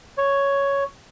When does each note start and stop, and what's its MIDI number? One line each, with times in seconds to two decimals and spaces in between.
0.18 0.84 73